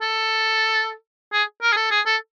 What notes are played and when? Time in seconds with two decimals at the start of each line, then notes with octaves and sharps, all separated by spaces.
0.01 A4
1.33 G#4
1.62 A#4
1.73 G#4
1.76 A4
1.91 G#4
2.06 A4